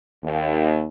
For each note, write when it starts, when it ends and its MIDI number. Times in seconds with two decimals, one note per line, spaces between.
0.24 0.88 39